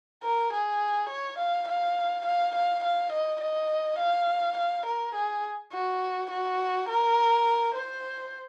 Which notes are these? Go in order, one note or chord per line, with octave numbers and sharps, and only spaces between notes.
A#4
G#4
C#5
F5
F5
F5
F5
F5
D#5
D#5
F5
F5
A#4
G#4
F#4
F#4
A#4
C5